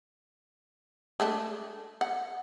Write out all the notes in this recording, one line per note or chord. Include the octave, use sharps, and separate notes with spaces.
G#3 A3 D4
F#5